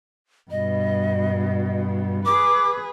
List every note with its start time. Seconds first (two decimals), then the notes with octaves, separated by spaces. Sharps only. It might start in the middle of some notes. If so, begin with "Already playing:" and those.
0.51 G2 B2 D#5
2.26 G#4 B4 D6